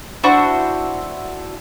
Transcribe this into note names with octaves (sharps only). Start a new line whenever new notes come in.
D4 E4 F#4 C5